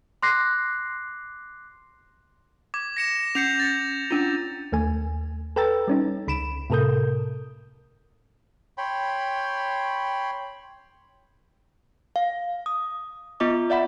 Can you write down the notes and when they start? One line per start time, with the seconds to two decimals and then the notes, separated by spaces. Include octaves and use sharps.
0.23 C6 D6 F#6 A#6 C7
2.74 D6 G#6
2.97 A#6 C#7 E7
3.35 C#4 G6 C7 C#7 F7
3.60 A6
4.11 C#4 D4 F4
4.72 D#2 A3 G#5
5.56 A4 B4 G5 A#5 E6 A6
5.88 G3 C#4 D#4
6.28 C#2 B5 D7 E7
6.70 A2 C3 A4 A#4 D#6 G6
8.78 C#5 G5 B5 C6
12.16 F5
12.66 D#6
13.40 B3 F4 D#5 D6
13.70 D5 E5 F#5 B5